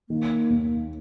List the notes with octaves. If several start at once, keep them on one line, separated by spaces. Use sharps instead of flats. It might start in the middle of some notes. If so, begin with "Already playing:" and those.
D#3 A#3
D#2